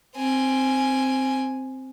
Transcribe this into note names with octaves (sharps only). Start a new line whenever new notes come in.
C4 G#5